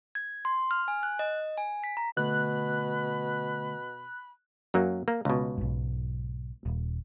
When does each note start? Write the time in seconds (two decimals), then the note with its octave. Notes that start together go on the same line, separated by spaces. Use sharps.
0.15 G#6
0.45 C6
0.71 F6
0.88 G#5
1.03 F#6
1.19 D#5
1.57 G#5
1.84 B6
1.97 A#5
2.17 B2 D3 A3 B5 F#6
4.74 F#2 F#3 A#3
5.08 A#3
5.25 C#2 B2
5.58 B1 G#2
6.65 D#1